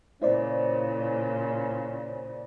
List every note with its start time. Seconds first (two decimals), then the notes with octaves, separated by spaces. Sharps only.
0.22 A#2 C#3 C#4 E4 C5 D5